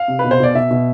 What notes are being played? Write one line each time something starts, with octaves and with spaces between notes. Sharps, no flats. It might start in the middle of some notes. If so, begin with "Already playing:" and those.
Already playing: F5
C3
B4
B2
C5
B2 D5
B2 E5
B2